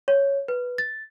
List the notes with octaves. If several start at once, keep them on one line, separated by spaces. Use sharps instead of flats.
C#5
B4
A6